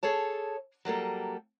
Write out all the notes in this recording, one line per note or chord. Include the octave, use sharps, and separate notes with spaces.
G#4 A4 C#5 A5
F#3 G3 A#3 A4